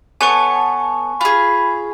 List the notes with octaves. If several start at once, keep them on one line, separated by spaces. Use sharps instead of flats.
B3 A4 C#5 G#5 C#6
F4 G#4 B5